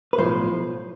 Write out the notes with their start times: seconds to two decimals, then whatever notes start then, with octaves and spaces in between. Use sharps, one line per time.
0.13 B4
0.18 B1 A2 F3 C5